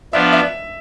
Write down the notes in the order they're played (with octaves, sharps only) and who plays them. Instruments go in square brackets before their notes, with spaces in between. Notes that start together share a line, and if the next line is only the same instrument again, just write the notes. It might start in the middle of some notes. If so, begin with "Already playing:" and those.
[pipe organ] F3 B3 D4 [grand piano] E5
[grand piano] E5